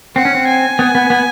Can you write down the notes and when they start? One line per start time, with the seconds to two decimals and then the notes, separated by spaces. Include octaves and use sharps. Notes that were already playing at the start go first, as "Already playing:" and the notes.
0.16 C4 F#5
0.25 C#4
0.35 C4
0.48 G#5
0.79 B3
0.95 B3
1.10 B3